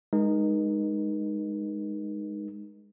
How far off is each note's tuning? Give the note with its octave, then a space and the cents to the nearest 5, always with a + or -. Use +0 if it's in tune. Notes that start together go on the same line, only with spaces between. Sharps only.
G#3 +0 D#4 -15 A#4 +40